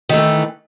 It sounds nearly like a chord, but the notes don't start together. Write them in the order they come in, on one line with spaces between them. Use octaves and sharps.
D#3 A3 E3